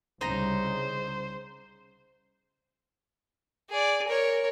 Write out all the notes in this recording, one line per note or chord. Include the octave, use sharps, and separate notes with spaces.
C2 C#3 G3 D#4 C5 A#5
G#4 D5
A#4 C#5